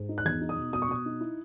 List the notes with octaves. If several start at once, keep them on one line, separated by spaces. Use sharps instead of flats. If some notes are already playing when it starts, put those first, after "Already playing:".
Already playing: G#2
D#4
F#6
E2 G#6
D#4
D#6
B2
B2 D#6
C#6
B2 D#6
D#4
E4